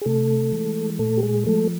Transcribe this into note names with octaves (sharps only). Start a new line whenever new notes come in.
G#4
C3 A3 A4
E3 G#3
A#2 A3 A4
G4
G#3 G#4
F3 G#3 A3 A4